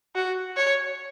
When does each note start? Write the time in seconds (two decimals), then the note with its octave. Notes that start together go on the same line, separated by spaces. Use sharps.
0.15 F#4
0.56 C#5